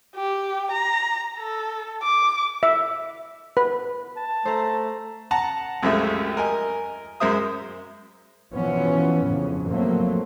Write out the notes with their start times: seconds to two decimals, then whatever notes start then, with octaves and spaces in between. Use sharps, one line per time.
0.16 G4
0.72 A#5
1.39 A4
2.03 D6
2.63 E5
3.57 B4
4.17 A5
4.45 A3 C5 A#5
5.31 F#5 A5 A#5
5.82 C2 F#2 F3 G#3 A3 E5
6.37 A#4 D#5 G#5
7.20 F#2 G#3 A#4 C5 E5 D#6
8.54 B2 E3 F3 B3 C#4
9.25 F2 A2 C#3
9.69 F3 F#3 A3 A#3 C4